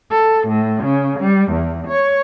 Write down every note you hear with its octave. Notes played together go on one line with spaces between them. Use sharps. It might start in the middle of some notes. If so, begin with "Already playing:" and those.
A4
A2
C#3
G3
E2
C#5